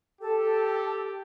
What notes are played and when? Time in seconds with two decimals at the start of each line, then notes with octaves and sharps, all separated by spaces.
0.21 G4 A4